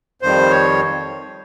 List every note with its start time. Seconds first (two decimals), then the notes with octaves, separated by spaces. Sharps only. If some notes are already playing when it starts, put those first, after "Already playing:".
0.22 F2 D#3 G3 C5
0.51 C#5